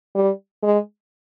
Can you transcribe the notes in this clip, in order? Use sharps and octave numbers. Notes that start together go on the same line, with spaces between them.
G3
G#3